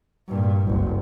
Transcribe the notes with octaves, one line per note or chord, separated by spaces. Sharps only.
G2 A#2
F#1 C2